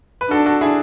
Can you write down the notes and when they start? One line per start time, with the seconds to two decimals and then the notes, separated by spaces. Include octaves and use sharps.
0.21 B4
0.31 D4 F#4 A4
0.46 F#4 A4
0.61 E4 G#4